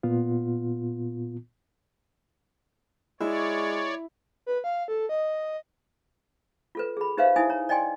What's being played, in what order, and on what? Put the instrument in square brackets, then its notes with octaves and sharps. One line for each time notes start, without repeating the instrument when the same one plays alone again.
[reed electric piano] A#2 B3 F4
[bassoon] G#3 [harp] E4 [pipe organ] C#5 D5
[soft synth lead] B4
F5
A4
D#5
[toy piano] F4 A4 B4
G#4 B5
D#4 G4 B4 C5 E5 F5
D#4 E4 G#5 D#6
C#5 A#5
D5 D#5 G5 G#5 C6